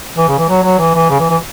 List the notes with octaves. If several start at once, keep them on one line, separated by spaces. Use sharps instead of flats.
E3
C#3
E3
F#3
F#3
E3
E3
C#3
E3
E3